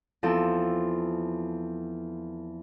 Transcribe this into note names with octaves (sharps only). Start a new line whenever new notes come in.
E2 F3 C4 A4 E6